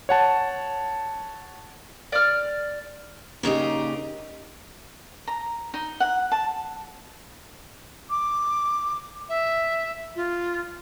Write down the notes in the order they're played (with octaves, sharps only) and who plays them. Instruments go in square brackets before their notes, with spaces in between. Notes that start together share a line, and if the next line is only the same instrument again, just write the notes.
[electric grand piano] C#5 F#5 A5
[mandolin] D5 F6
[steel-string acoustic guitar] A#2 C#3 D#4 G4
[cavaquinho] A#5
D#4
F#5
A5
[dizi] D6
E5
F4